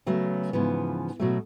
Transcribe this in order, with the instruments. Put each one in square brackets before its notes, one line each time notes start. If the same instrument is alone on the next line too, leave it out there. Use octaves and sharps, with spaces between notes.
[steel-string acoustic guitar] C#3 F#3 A3 B3
G#2 C#3 E3 F3 B3
B2 F#3 A3